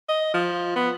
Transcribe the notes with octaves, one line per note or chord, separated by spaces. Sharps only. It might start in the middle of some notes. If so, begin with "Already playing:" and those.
D#5
F3
B3